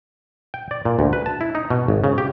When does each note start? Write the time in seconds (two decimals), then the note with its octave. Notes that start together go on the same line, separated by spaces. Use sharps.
0.54 G5
0.71 D5
0.85 A#2
0.99 D2
1.13 B4
1.26 A5
1.41 E4
1.55 D#4
1.70 B2
1.88 G#1
2.04 C#3
2.18 G4